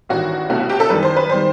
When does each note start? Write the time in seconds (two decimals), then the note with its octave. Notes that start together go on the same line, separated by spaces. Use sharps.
0.09 A1 G2 D#3 F#4
0.50 C2 B2 A3 F#4
0.60 F#4
0.69 G4
0.80 A4
0.90 F#2 D#3 G3 B4
1.03 C5
1.16 B4
1.30 D#3 G3 C5